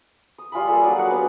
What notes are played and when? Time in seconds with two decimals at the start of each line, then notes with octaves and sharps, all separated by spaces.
0.38 D#6
0.52 G3 F4 G#5 B5
0.67 A#3 G#4 A4
0.83 F#3 D4 G#4 D5
0.98 F#4 F#5
1.11 B3 G4 B4